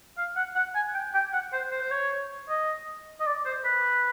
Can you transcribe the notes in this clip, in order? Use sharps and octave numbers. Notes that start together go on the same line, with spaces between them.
F5
F#5
F#5
G#5
G5
G5
F#5
C5
C5
C5
C#5
D#5
D#5
D5
C5
B4